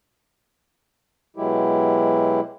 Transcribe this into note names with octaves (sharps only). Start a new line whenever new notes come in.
B2 F#3 G#3 E4 G4